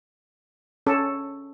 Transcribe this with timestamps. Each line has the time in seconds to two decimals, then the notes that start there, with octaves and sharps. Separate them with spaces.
0.87 C#4 A4